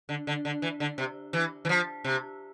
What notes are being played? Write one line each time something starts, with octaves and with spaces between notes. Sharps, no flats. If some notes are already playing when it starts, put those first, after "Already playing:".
D3
D3
D3
E3
D3
C3
E3
E3
F3
C3